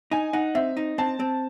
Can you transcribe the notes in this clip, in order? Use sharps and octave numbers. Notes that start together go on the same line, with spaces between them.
D#4 G#5
D#4 F#5
C4 E5
D#4
C4 A5
C4